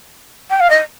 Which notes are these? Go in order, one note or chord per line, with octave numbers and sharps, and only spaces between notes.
G5
F5
D#5